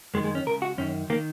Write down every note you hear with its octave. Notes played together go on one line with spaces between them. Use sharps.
F#2 D#3 G#3
G#3
C#4
C#2 C#3 A#4
F#4
F#2 D#3 C#4
D#3 A#3